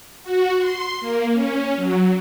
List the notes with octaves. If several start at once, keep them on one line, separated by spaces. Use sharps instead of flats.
F#4
C6
A#3
C#4
F#3